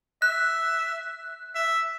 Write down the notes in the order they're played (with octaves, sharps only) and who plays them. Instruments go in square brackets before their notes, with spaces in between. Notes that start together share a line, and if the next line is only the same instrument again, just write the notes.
[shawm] E5 [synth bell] F#6
[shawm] E5